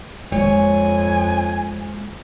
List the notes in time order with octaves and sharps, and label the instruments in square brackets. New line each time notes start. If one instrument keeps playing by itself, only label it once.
[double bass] F2 [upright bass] G#3 A#3 [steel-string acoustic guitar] C#5 [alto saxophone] G#5